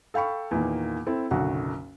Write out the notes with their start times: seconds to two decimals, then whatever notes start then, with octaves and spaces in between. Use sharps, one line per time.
0.14 A4 F5 G5 B5 C#6
0.51 E2 A#2 D#3 A#3
1.06 C4 E4 A4
1.31 F#1 B1 D3 F#4 F#5